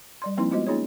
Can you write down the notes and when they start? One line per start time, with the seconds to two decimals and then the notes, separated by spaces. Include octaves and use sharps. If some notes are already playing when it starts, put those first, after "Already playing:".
0.22 G3 D5 C6
0.37 F3 A#3 C4 D#4 E4 C6
0.51 G#3 B3 F4 F#4 C5 D#5
0.67 A#3 C#4 D#4 F4 G#4 C#5